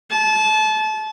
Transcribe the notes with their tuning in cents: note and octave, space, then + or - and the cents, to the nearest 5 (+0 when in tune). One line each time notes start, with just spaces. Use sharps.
A5 -30